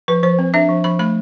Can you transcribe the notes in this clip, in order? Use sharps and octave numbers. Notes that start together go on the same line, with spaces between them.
F3 B4
F3 C5
C4
D4 E5
F3
F3 B5
A3 B5